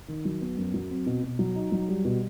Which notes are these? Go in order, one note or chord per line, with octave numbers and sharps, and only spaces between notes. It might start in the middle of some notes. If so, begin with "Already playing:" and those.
D#3
F#3
B3
F#2
F#3
C4
B2
B2
F#3
D#4
F#3
G3
B2